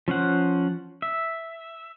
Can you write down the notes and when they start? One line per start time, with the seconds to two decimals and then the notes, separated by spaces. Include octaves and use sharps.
0.08 F3 C#4 C5 F#5
1.02 E5